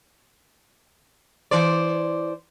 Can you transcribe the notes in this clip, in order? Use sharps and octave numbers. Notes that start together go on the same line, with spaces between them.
E3 C5 D5